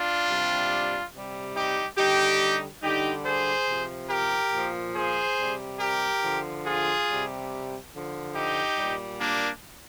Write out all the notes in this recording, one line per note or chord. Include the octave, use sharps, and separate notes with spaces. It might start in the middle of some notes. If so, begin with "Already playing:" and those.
Already playing: D4 F4
C3 G3
C3 G3
D#4 G4
D3 G3 D#4 G4
D3 G3 D#4 G4
G#4 C5
C3 F3
G4 A#4
A#2 F3
G#4 C5
C3 G3
G4 A#4
D3 F3
F4 G#4
C3 G3
D3 F3
D#4 G4
A#2 G3
A#3 D4